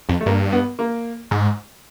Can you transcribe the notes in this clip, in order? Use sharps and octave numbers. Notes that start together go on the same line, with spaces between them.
F2
A3
G2 A#3
B3
A#3
G#2